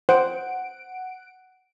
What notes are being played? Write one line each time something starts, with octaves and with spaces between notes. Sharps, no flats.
C5 F#5 D7